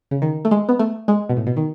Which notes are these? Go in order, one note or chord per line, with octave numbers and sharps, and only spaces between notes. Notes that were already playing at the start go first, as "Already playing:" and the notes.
C#3
D#3
A3
G#3
B3
A3
G#3
B2
A2
B2
D#3